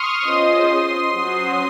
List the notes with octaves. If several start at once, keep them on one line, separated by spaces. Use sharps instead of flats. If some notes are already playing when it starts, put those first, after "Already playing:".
Already playing: C6 C#6 D#6 F6
C#4 F4 G#4 C5 D#5 C6 D#6
F#3 C#4 F#4 C5